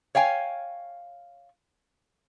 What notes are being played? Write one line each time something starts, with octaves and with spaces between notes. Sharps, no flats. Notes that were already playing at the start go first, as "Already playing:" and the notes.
C#5 F5 G5 G#5